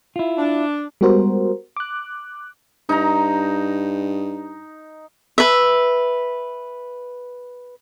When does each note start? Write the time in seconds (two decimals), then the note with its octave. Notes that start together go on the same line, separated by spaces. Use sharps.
0.16 E4 F4
0.38 D4
1.01 G3 G#3 B3 F#4 A#4 C5
1.77 D6 F#6
2.89 G2 D#4 A#5
5.38 B4 E5